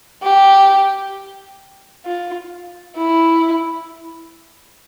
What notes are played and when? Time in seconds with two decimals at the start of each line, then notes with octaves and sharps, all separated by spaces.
0.23 G4
2.05 F4
2.96 E4